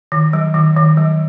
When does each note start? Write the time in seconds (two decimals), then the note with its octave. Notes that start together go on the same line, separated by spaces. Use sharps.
0.12 D#3
0.33 F#3
0.54 D#3
0.77 D#3
0.97 F#3